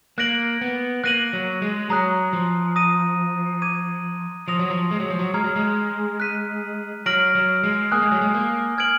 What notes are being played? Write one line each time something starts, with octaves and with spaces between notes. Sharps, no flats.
A#3 F#6 A#6 D7 F#7
B3
A#3 F#6 A#6 D#7 F#7
F#3
G#3
F#3 A#5 D#6 F#6
F3
A#5 D#6 A#6 D#7
D6 G#6 D#7
F3 D#6 A#6 F7
F#3
F3
G#3
F#3
F3
F#3
G#3 A#5 F6 G#6
F#3
G#3
F#6 B6 D#7
F#3 F6 A#6 D7 F#7
F#3
G#3
A#3 G#5 D#6 F#6
G#3
F#3
G#3
A#3
F6 G#6 D7 F#7